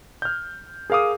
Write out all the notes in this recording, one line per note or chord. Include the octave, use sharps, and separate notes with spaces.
F6 G6
G#4 A#4 F5 D6 D#6